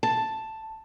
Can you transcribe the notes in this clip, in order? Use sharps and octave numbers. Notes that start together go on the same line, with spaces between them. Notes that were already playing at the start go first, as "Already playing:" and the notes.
A5